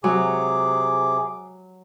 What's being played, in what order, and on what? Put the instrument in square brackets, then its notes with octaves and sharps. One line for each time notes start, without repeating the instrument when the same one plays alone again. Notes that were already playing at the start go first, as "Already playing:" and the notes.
[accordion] C3 G#4 D6 [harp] F#3